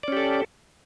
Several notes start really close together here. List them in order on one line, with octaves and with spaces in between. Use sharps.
D5 C#4 G4 A4